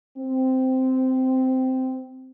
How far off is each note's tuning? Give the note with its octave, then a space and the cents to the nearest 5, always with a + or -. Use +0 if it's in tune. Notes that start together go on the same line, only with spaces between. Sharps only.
C4 -10